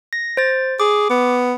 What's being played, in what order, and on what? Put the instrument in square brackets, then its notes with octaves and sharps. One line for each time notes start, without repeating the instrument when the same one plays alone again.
[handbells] A#6
C5 A6
[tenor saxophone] G#4 [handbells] D6
[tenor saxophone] B3